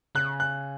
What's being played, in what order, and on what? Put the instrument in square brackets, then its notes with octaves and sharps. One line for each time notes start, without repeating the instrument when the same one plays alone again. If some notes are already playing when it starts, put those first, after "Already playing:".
[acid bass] C#3 [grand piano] F#6
[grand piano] F#6